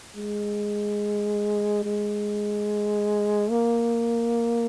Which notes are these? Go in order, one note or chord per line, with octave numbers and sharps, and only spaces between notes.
G#3
G#3
A#3